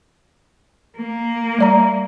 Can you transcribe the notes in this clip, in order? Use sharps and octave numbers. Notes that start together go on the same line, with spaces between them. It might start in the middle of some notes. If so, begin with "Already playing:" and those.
A#3
G3 D5 A#5